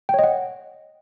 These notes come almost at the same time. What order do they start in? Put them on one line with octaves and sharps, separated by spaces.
G5 C#5 D#5 F#5